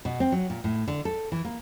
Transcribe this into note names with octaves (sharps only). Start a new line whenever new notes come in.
B2
C4
F#3
A#2
A2
D3
A4
E3
A#3